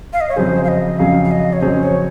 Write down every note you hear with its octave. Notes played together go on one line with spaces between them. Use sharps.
F5
D#5
C#5
F2 C#3 F#3 C#4 G#4 C5
F5
D#5
F2 C#3 F#3 C#4 G#4 F5
F5
D#5
C#5
F2 C#3 F#3 C#4 G#4 C5
C#5